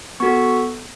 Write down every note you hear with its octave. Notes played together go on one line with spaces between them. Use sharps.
B3 F#4 A4 C#6